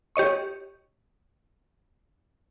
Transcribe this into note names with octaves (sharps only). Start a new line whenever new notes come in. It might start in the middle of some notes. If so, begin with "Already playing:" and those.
G4 C#5 D#5 C#6